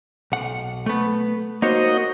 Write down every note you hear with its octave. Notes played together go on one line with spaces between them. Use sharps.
B1 F#5
A3 B3
A#3 D#4 F#4 C5 C#5 D#5